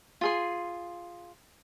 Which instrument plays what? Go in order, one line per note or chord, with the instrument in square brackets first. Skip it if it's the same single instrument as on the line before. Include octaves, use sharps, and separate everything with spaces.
[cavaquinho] F4 G#4 C6